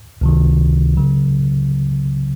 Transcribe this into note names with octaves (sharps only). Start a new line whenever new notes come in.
C#2 C3 D#3
C#3 F#3